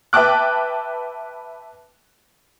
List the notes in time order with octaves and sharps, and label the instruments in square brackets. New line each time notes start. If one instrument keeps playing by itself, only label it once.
[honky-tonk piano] B4 E5 G5 A5 D6 F#6